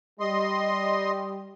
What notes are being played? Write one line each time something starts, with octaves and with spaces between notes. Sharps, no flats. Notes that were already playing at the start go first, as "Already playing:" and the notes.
G3 D#5 C6